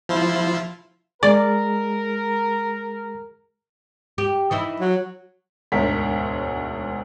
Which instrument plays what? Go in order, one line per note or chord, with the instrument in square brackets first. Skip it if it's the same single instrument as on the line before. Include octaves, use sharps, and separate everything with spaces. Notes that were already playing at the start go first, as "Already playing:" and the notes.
[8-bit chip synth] F3 E4 F4
[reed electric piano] G#3 G#4 [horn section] A#4 [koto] D5
[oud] G4
E3 D#4 E4
[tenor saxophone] F#3
[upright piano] E1 D2 G#2 A#4 C#5 B6